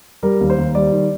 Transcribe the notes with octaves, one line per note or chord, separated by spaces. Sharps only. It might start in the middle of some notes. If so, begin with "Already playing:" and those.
G3 A#4
D#2
C5
D#2
G3 D5
D#3